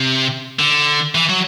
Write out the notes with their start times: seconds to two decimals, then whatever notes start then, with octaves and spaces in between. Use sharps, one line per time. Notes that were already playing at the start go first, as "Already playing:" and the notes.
Already playing: C3
0.60 D3
1.15 E3
1.29 F#3